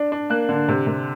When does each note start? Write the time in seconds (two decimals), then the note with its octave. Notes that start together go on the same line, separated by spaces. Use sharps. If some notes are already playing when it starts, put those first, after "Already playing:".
Already playing: D4
0.12 D4
0.30 A#3 F#6
0.49 D3
0.69 C3
0.87 C3